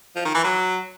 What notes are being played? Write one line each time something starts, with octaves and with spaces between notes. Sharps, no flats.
F3
D#3
E3
F#3